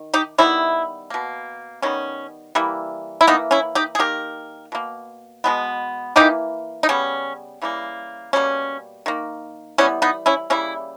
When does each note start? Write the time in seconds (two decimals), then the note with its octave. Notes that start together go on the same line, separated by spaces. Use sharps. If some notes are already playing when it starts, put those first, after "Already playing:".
Already playing: D#3
0.14 D#4 G4
0.38 D#3 G3 B3 C#4 E4
1.10 B2 A#3
1.82 D#3 G3 B3 C#4
2.55 E3 G3 A#3
3.21 E4
3.27 E3 A#3 B3 D#4
3.51 C#4 E4
3.75 D#4 G4
3.95 G#4
3.99 D#3 A#3 G4 A#4
4.72 B2 A#3
5.44 B2 G#3 B3
6.16 E3 A#3 D#4 G4
6.83 D#4
6.89 C#3 G3 B3 C#4
7.62 C#3 E3 G3 A#3
8.33 B2 G3 A#3 C#4
9.06 D#3 A#3
9.78 E3 G3 B3 C#4
10.02 B3 D#4
10.26 C#4 E4
10.50 C#3 G3 A#3 C#4 E4